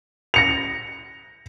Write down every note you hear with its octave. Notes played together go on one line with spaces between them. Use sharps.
A#6 C#7 F7